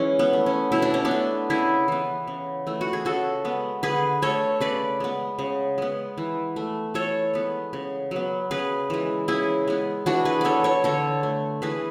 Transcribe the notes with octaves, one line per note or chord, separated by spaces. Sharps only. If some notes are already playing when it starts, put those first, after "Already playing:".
Already playing: E3 G#3 C#4 E4
B3
A3
C#4
B2 E4
D4
C#4
B3 D4
A3
C#3 E4 G#4
E3 B3
C#3
E3 A3
F#4
G#4
C#3 F#4 A4
G#3 B3
D3 G#4 B4
A3 A4 C#5
C#3 B4 D5
G#3 B3
C#3
G#3 B3
E3
A3
E3 A4 C#5
G#3 B3
C#3
F#3 B3
C#3 G#4 B4
E3 G#3
C#3 E4 G#4
G#3 B3
E3 D4 F#4
G#4 B4
B3 A4 C#5 D5
A4 C#5
D3 A4 C#5
A3
E3 G#4 B4